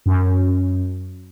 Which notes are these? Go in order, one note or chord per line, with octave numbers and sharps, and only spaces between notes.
F#2